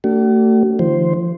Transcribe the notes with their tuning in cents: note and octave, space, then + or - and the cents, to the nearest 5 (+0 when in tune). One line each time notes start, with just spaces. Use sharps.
A3 +30 D4 -20 F#4 +45
D3 +30 F3 -40 C5 +0